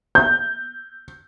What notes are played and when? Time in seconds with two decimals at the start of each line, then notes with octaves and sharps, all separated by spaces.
0.15 G6